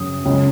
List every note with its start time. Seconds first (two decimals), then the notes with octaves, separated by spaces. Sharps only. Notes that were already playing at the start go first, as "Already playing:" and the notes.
Already playing: F#2 C#3 F#3 D#6
0.25 C#2 C#3 G#3